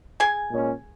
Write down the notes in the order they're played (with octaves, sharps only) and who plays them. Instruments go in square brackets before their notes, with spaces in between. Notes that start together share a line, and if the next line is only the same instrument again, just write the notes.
[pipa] G#4 G#5
[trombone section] A#2 G#3 C#4